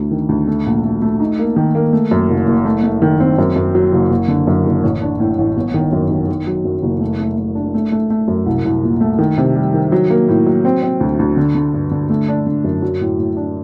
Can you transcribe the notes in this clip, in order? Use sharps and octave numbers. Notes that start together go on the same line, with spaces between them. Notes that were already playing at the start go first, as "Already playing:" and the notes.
Already playing: D2 A3
D#3
D2
A3
A#1
A3
A3
D#4
A#3
D#3
A#3
A3
F#2
F#1
F#1
A3
A3
D#3
C4
F#2
F#2
F#3
F#1
F#1
D3
F#2
F#1
A1
D4
A2
A1
G1
D#3
F#2
D#3
D#3
F#3
F#2
F#1
A3
A3
A3
D4
A3
A3
A3
F#2
C2
C2
A#2
A3
D#3
C3
G3
D#3
F#3
A#3
A2
F#3
C4
C4
D2
D2
D3
D3
G2
D3
A3
D4
D3
F#2
F#3
A2
A2
D4